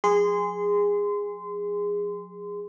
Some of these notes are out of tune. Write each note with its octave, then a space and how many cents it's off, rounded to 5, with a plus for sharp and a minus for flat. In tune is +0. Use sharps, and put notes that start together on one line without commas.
F3 +45 G#4 -20 C6 -25